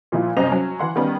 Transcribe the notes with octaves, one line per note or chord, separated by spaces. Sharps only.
A#2 F3 E4
C2 F#2 C5 D#5 G5 F7
F#3 C#4
E3 F#5 C6
D#3 G3 B3 C#4